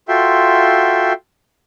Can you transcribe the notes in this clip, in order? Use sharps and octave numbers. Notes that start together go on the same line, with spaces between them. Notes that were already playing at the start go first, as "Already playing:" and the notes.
F4 F#4 A4 E5 G5 C6